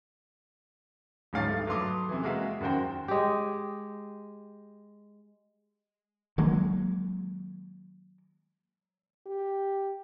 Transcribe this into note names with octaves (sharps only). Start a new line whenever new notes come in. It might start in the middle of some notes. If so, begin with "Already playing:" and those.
D1 G#2 C#5 F5 A6
G2 A3
F#3 A4 B4 C6 D6 D#6
C3 E3
G#3 A#3 F#4 A#4 E5 F5
F#2 D#3 F#4 C5 G5
G#3 G4
D#3 F#3 G#3 A#3
G4